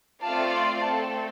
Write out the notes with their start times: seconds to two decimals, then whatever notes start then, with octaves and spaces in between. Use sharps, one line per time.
0.22 A3 C4 F4 D5 F5 A5
0.52 C6
0.82 A3 C4 A4 A5